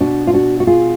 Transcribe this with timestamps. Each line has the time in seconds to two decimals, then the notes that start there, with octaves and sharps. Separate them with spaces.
0.01 B2 D4 F#4
0.27 F4
0.33 D4 F#4
0.60 F#4
0.67 F4 G#4